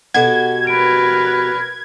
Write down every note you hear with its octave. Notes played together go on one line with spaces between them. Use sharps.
B2 F#4 G4 A4 F#5 G#6
A#4 B4 D7